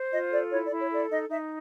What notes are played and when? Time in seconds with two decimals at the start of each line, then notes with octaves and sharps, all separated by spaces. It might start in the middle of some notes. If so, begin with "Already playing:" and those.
Already playing: C5
0.11 F4 D#5
0.31 A4 D5
0.51 E4 C#5
0.66 D5
0.71 E4
0.80 C#5
0.91 A4 D5
1.09 D#4 D#5
1.30 D#4 E5